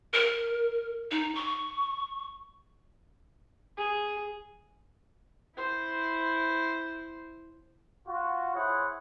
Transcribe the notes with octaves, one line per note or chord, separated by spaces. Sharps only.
A#4
D#4
C#6
G#4
E4 C5
F4 F#4
E4 G#4 C5 C#5 F#5